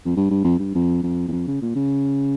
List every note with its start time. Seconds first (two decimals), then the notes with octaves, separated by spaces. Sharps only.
0.05 F2
0.16 G2
0.30 G2
0.44 F2
0.59 G2
0.75 F2
1.03 F2
1.28 E2
1.32 F2
1.47 C#3
1.62 A#2
1.75 C#3